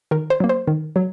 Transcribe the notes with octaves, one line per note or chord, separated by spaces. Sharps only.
D#3 A#4
C5
F#3 A#3
C5
D#3
F#3